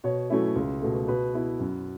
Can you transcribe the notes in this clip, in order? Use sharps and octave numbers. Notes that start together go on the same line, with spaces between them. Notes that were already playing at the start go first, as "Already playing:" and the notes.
B2 C#5
F#3 A3 C#4 E4
C#2
B2 A3
B2 B4
B3 E4
F#2